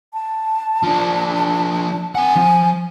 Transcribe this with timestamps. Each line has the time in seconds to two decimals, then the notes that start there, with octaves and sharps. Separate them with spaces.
0.13 A5
0.84 F3 D4
2.15 C4 F#5 G#5
2.36 F3